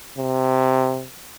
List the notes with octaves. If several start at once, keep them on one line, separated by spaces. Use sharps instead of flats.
C3